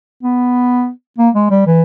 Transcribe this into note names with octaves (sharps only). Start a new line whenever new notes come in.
B3
A#3
G#3
G3
E3